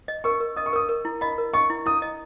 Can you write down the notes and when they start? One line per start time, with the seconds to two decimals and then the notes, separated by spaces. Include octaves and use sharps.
0.08 D#5
0.24 A#4 C#6
0.40 A#4
0.56 D#5 D#6
0.66 C#6
0.73 A#4 D#6
0.89 A#4
1.05 E4
1.21 D#5 B5
1.38 A#4
1.54 D#5 C#6
1.70 E4
1.86 E4 D#6
2.02 D#5